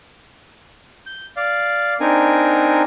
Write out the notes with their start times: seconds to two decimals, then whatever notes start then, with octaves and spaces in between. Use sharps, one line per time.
1.06 G6
1.37 D5 F5
2.00 C4 D4 D#4 A#4 G#5